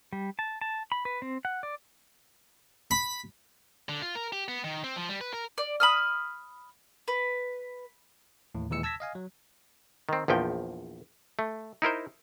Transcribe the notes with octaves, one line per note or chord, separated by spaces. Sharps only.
G3
A5
A5
B5
B4
C4
F#5
D5
B5
D3
F4
A#4
G4
B3
D#3
C4
F3
G3
B4
A#4
D5
B5 D#6 F6
B4
D#2 A2 E3
D#2 A#2 E3 G#3 E6 C#7
A5 E6 G#6 A#6 B6
D#5 F5 G#5
F#3
D#3 C4
A#1 E2 F3 G5
A3
D#4 E4 A#4 C5